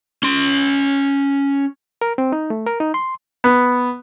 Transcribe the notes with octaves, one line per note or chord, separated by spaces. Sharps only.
C#4 C6
A#4
C4
D#4
A3
A#4
D#4
C6
B3